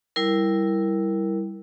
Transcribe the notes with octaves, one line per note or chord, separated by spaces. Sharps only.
G3 E4 A#4